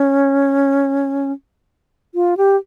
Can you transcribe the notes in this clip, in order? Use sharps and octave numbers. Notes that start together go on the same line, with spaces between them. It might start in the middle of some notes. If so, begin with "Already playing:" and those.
Already playing: C#4
F4
G4